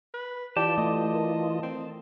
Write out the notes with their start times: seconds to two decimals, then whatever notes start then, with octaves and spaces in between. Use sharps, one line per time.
0.14 B4
0.57 E3 F4 G4 D5 A5
0.78 A3 D#5
1.14 A#4
1.63 C4